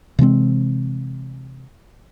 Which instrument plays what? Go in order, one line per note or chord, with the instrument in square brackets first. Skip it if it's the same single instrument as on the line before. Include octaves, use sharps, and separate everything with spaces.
[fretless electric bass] C3 E3 G#3 C4